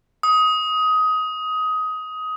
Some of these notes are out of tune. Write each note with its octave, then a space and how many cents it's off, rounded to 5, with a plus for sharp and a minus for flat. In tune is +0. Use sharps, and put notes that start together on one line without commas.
D#6 +15